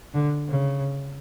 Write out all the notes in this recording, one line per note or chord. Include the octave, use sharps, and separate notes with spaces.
D3
C#3